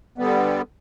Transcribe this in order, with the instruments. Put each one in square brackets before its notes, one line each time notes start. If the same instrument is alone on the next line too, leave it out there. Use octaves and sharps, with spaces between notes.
[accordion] D3 G3 B3